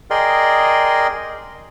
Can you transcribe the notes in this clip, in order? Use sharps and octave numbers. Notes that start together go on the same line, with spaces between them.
G#4 A#4 D5 D#5 G5 C6